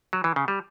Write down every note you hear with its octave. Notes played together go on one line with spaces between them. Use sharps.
F#3
E3
C#3
G3